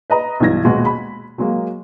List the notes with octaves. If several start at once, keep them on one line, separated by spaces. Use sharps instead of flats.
B4 D#5 A#5
B1 G2 E3 G#6 A#6
D#1 B2 G#3 F#4
B5
F#3 G#3 A#3